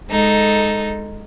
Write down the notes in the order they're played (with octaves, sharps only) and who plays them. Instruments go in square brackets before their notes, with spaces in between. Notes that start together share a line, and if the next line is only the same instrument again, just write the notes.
[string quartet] G#3 D#4 A4